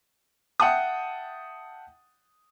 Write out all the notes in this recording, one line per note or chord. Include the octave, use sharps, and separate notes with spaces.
E5 F#5 G5 A5 D#6